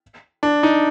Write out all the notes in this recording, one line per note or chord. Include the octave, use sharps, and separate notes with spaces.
D4
D#4